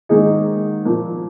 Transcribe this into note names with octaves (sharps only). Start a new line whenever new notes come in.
G#2 D#3 A#3 D#4 G#4
A#2 F3 A#3